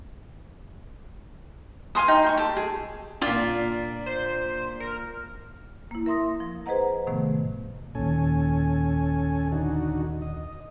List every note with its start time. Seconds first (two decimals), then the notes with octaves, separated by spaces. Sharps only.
1.95 F5 G#5 C6 D#6
2.08 D#4 G5
2.24 G5 C6 C#6
2.37 G4 A4
2.57 G#4
3.22 A#2 D4 F4
4.06 C5
4.80 A#4
5.91 A#3 E4
6.06 A#4 E5 C6 D#6 A#6
6.40 F3
6.66 G#4 B4 C5 D#5 F#5 A#5
7.07 A2 C3 D#3 F3 A3 B3
7.95 D#2 A#2 C#4 A4 G#5
9.52 D3 D#4 F#4
10.22 D#5